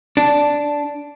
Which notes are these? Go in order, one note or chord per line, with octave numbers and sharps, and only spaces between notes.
D4